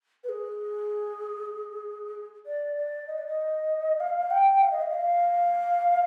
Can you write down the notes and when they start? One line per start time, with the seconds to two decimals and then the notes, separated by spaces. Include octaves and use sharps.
0.24 B4
0.29 G#4
2.46 D5
2.77 D5
3.07 D#5
3.18 D5
3.27 D#5
4.00 F5
4.30 G5
4.62 F5
4.71 D#5
4.81 F5
4.89 D#5
4.93 F5